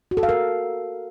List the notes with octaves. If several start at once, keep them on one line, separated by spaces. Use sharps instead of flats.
F#4
A4
F5
A#4